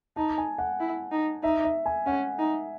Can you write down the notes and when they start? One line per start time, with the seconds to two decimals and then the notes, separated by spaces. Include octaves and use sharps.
0.16 D#4 A5
0.38 G#5
0.58 F#5
0.80 E4
1.12 D#4
1.43 D#4 E5
1.65 E5
1.86 G#5
2.06 C#4 F#5
2.39 D#4